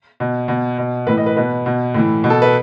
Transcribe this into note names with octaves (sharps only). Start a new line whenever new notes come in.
B2
B2
B2
A2 E3 B4
D#5
B4
B2 B4
B2
A2 E3
B2
A4
B4